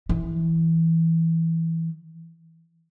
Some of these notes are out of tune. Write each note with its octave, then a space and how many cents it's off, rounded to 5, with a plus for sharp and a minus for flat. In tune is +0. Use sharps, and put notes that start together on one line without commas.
E3 -5